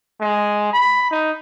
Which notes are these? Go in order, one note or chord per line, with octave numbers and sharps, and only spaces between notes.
G#3
B5
D#4